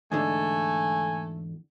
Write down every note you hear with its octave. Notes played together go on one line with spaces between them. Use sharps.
E2 G#2 D3 A3 G#5